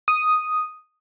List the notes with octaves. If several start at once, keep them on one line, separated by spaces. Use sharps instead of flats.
D#6